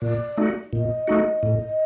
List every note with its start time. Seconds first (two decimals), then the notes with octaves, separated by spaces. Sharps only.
0.02 A#2 D5
0.37 A3 D#4 F#4
0.73 A#2 D#5
1.08 A3 D#4 F#4
1.43 A2